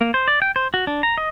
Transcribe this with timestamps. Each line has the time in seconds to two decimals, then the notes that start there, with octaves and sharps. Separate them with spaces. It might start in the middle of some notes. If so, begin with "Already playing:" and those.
0.01 A#3
0.14 C5
0.28 D5
0.42 G5
0.56 C5
0.74 F#4
0.87 D4
1.03 A#5
1.18 D#5